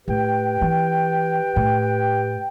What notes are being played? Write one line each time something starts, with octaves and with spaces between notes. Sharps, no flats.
A2 G4 B4 G5
E3
A2